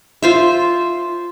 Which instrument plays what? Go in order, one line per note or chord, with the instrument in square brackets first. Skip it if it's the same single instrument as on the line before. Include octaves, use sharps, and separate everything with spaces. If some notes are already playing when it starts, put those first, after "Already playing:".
[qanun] F4 C5 E5